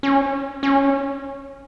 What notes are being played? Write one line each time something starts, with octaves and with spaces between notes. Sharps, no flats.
C#4
C#4